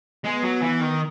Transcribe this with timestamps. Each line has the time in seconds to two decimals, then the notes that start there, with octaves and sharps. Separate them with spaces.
0.25 G#3 B3
0.44 F#3
0.63 E3
0.82 D#3